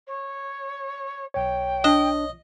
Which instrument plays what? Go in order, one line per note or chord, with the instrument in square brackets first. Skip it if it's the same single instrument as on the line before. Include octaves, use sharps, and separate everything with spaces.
[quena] C#5
[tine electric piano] B1 C#5 [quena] G5
[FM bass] D4 [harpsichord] D#5